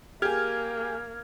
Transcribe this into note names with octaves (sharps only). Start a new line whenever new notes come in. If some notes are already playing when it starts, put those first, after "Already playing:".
A#3 G4 G#4 F6 G#6